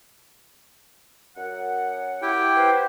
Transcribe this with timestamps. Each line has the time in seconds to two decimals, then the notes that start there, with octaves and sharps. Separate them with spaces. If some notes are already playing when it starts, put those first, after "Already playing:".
1.37 F#2 F#5
2.22 E4 G4 G5
2.55 B3 B4 C5